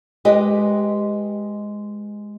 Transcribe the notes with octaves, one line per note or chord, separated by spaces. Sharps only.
G#3 G4 B4 D#5